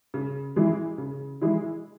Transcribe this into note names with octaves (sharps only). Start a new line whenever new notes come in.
C#3
E3 G#3 E4
C#3
E3 G#3 E4